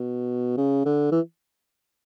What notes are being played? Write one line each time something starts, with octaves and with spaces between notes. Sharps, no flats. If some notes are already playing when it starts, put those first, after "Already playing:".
Already playing: B2
C#3
D3
E3